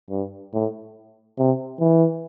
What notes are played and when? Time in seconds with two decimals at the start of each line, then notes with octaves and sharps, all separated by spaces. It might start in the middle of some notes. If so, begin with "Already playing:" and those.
0.10 G2
0.53 A2
1.38 C3
1.80 E3